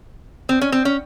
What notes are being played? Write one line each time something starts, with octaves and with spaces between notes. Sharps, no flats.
C4
C#4
C4
C#4